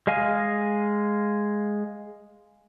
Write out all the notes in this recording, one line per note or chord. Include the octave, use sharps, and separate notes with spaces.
G#3 D#5 F5 G#5